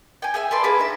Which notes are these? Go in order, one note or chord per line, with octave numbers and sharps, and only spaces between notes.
G5 G#5
G#4 E5 G#5
A4 B4 D5 C6
A#3 G#4 B4 D6
D#4 E5